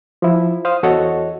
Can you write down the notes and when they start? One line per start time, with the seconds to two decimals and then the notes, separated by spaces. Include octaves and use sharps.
0.22 F3 E4
0.65 C5 F5 D#6
0.83 E2 F#4 A4 C#5 D#5 F#5